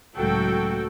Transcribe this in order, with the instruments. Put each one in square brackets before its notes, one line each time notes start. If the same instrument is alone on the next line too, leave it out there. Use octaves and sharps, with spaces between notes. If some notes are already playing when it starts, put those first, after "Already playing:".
[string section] C#2 A2 F#3 [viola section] F#4 A4 G5